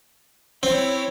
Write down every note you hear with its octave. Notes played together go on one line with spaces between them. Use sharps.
C4 E4 C#5